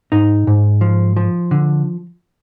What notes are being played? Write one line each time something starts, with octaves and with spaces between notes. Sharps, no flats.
G#2 D#4
G#2
F3
F3
D3